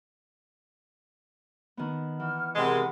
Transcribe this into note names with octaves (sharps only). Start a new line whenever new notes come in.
D#3 B3
E3 F#5 F6
C3 G#3 A#4 F#5 B5 C6